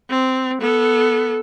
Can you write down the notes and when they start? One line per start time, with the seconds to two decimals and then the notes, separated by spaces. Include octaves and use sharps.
0.10 C4
0.61 B3 A4